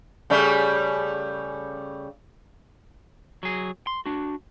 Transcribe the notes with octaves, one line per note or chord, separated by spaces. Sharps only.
C#3 G3 A3
F#3 G#4
C6
D4 F#4